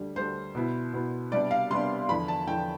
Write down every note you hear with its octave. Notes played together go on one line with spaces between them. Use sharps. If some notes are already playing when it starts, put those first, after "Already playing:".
Already playing: D2 D3 G3
D2 D3 G3 C5
B2 B3 E4
B2 B3 E4
C3 G3 B3 D4 D5
F5
C3 G3 B3 D4 C6
E2 D3 F3 B5
A5
E2 D3 F3 G5